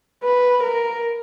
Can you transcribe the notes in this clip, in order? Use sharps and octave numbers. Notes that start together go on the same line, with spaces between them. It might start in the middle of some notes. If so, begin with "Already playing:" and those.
B4
A#4